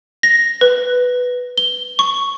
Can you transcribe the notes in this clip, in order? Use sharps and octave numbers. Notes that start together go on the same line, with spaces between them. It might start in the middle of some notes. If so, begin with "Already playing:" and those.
A#6
B4
G7
C#6